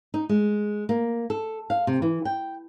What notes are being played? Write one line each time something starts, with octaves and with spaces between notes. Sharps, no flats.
D#4
G#3
A#3
A4
F5
C3
E3
G5